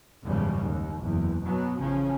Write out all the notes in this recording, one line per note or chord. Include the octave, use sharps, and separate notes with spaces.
F#1 E2 G#2 C#3 F3 G3
D#2
F#1 E2
B2 F#3 B3
A1 C#3 F3 C#4